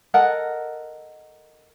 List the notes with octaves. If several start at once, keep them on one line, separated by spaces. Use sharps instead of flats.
A4 A#4 D#5 F#5